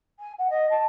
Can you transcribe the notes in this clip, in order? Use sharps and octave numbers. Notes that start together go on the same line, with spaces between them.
G#5
F#5
D#5
A5